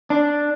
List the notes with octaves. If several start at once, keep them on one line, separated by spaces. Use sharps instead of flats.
D4